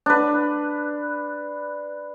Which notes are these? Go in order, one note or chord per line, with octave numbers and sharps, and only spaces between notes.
D4 B4